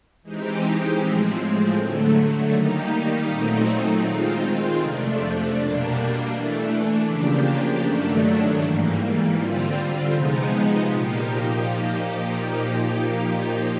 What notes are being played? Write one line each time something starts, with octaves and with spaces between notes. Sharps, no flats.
E3 G#3 C4 D#4 G4
A2 F3 G#3 C4
D3 F#3 A3
D#3 G3 A#3 D#4 G4
A#2 F#3 A3 C4 D#4
D#3 G#3 C4 F4
F2 C3 F3 A3 D4
B2 G3 A#3 D4
E3 A3 D4
C#3 F3 A#3 D4 G4
G2 D#3 F#3 A3 D4
G#2 E3 G3 A#3
D3 G3 C4 F4
C3 F3 G#3 B3 D#4
A#2 F3 A#3 D#4 G4